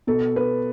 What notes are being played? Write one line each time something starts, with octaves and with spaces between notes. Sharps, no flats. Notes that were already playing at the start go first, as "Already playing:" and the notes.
B2 A4
B4